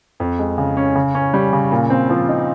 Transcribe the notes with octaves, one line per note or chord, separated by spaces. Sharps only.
F2
G#3
C#3
C#4
C#3
C#4
G3
C#3
A#2
C4
F3
D#4